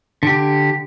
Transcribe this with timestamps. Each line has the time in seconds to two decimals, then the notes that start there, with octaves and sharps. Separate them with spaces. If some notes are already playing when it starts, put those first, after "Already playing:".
0.23 D3 G4